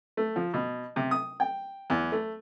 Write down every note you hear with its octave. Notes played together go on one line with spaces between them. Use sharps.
A3
F3
B2
C3
D#6
G5
E2
A3